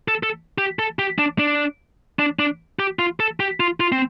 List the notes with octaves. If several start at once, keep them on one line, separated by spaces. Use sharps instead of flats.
A4
A4
G4
A4
G4
D4
D4
D4
D4
G4
F4
A4
G4
F4
F4
C4